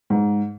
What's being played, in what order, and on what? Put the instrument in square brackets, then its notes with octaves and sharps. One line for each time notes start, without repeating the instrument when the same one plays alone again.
[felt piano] G#2